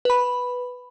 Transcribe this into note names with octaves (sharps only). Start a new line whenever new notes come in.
B4 B5